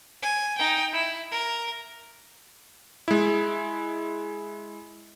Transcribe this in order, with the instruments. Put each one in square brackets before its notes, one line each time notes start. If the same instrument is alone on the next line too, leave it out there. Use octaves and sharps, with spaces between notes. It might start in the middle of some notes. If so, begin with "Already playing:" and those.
[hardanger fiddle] G#5
D#4 G5
E4
A#4
[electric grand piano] G#3 E4